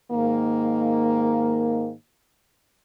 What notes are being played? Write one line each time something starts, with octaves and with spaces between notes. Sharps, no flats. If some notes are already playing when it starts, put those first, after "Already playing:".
G#2 D#3 A#3